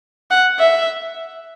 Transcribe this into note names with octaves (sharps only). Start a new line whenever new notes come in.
F#5
E5